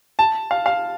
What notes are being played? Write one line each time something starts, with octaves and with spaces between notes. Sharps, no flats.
A5
F5
F5